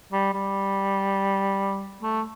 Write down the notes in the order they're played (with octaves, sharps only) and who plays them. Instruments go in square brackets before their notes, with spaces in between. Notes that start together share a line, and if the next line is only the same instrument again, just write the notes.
[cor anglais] G3
G3
A3